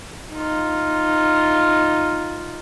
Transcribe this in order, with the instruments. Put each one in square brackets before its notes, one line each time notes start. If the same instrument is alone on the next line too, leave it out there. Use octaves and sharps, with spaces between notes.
[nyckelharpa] D#4 F4